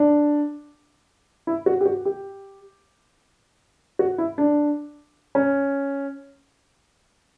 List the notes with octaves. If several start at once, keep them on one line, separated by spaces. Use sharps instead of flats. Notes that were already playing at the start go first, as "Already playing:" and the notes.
Already playing: D4
E4
F#4
G4
F#4
G4
F#4
E4
D4
C#4